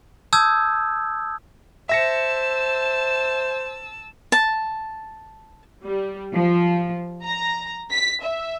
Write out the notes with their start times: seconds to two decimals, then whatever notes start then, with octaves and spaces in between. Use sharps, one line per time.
0.33 A5 D#6 E6 G6 G#6
1.89 C5 E5 A5 E6 A#6 C#7
4.32 A5
5.86 G3
6.33 F3
7.24 A#5
7.90 B6
8.23 E5